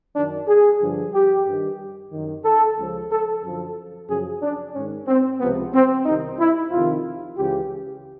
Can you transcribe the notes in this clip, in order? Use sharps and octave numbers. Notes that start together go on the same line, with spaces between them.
F#2 D#3 D4
G#4
G2 D3 F3
G4
G2 D#3
F#2 D#3
A4
C#2 C#3 F3
A4
F#2 D3 F3 A4
F#2 C#3 F3 G#4
D4
G#2 D#3 C#4
C4
C#2 C3 F3 B3
C4
C2 C3 D#3 D#4
E4
F2 C3 D#3 F4
C#2 C#3 E3 G4